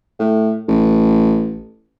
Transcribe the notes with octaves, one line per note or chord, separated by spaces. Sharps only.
A2
A1